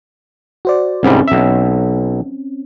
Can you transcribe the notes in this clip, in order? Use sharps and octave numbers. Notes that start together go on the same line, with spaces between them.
F#4 C5 D5
C2 G#2 G3 C4 C#4
B1 E5